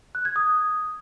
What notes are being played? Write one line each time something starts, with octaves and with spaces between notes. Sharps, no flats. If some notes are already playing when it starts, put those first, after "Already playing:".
F#6
G#6
D#6